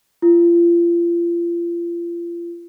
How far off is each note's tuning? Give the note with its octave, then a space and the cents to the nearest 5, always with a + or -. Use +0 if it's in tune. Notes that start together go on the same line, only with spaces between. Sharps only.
F4 -35